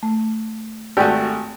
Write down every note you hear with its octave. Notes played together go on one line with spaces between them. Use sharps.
A3
G#1 A3 F#4 G4 D5 G#5